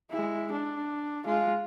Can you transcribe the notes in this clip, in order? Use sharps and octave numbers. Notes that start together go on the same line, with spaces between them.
G#3 E4
D4
G#3 F4